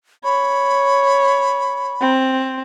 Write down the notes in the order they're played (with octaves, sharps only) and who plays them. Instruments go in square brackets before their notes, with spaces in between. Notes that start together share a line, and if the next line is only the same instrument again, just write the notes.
[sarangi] C#5 [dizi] B5
[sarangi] C4